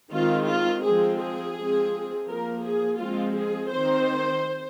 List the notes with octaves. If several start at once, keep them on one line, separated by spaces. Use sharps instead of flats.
D#3 G#3 C4 F4
F4
F3 G#3 C4 G#4
G#4
F3 G#3 C4
F3 A#3 A#4
G#4
F3 G#3 C4 F4
G#4
D#3 C4 C5